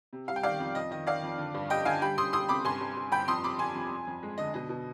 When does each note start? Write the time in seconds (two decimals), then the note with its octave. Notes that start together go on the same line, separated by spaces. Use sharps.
0.13 C3
0.28 G3 F5
0.36 G5
0.43 D#3 D5 F5
0.60 F2
0.75 F2 D#5
0.91 D#3 D#5
1.07 D#3 D5 F5
1.23 F2
1.38 D3
1.54 G2
1.70 G3 D#5 G5
1.85 D3 F5 G#5
2.01 G3 G5 B5
2.17 G3 C6 D#6
2.33 G3 C6 D#6
2.48 C3 B5 D6
2.65 G2 G#5 C6
2.81 G2
2.97 G2
3.12 G2 G5 B5
3.28 F2 C6 D#6
3.43 C3 B5 D6
3.59 F2 G#5 C6
3.75 F2
3.91 F2
4.07 F2
4.23 G#3
4.38 D3 D#5
4.54 B2 D#5
4.69 B2